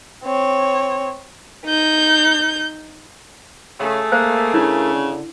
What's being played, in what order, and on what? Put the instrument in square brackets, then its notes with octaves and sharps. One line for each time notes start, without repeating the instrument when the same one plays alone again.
[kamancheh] C4 C#5
[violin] D#4 G6
[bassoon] C#3 [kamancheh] A3 G#4
[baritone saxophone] A#3 [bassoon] A#4 [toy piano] C5 F5
[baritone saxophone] C#3 [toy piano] D4 E4
[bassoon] D3